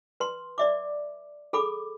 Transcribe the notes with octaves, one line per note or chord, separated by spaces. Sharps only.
B4 C6
D5 E5 D6
G#4 A4 B5 D6